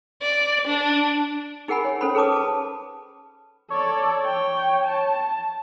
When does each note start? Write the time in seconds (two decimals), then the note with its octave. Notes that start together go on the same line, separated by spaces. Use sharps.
0.22 D5
0.67 D4
1.68 D#4 G#4 A#4 F#5 G#5 B5
1.85 C#5
2.01 C#4 A4 C5 C#5 B5
2.15 G#4 A4 B4 A5 D6 D#6
2.32 B4 A5
3.70 A4 C#5 D5
4.26 G5
4.85 A5